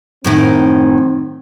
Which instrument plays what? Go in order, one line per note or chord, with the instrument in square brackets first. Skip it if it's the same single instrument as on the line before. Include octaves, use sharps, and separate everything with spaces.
[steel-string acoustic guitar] F#2 A2 D#3 [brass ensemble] C4